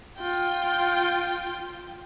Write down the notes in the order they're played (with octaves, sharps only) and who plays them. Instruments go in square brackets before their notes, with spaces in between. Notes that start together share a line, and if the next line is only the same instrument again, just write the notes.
[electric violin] F4 G5